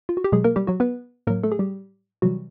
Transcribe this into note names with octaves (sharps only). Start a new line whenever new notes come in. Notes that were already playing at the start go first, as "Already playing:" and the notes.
F4
F#4
G4
B2 F#3 G#3 G#4
A#3 A#4
G3 G4
F#3 F#4
B3 B4
A2 F#3 A#3 A#4
A3 A4
G#4
G3 G4
C3 E3 F#3 G3 F#4